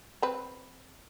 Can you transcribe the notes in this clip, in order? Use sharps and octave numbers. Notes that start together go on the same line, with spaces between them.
C4 B4